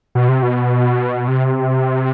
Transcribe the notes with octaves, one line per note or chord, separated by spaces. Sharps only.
B2
C3
B2
C3